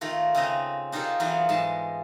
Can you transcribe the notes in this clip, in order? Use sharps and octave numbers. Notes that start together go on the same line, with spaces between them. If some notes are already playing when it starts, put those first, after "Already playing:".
D#3 A3 F4 A#4
C#3 C4 D#5 A#5
D4 D#4 F4 G4 A4 A#4
E3 F#3 B3 D#4 F4
G#2 G#3 A5